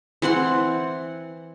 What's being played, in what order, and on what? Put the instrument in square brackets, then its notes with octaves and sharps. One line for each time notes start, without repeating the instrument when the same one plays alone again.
[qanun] E3 C4 F#5 C6